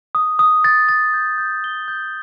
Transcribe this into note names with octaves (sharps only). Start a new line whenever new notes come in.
D#6
D#6
A6
A6
G6
G6
G7
G6